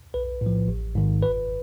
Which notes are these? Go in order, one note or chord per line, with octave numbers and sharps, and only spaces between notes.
B1 B4
A2
F3
A1
G#2 D#3
G1 B4